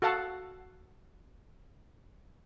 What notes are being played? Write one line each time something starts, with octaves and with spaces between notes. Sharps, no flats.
F#4 A4 F5 F#5 A5